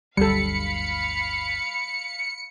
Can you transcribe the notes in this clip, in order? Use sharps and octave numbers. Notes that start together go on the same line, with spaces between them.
G1 D2 F#3 G3 A4 F5 B5 C#7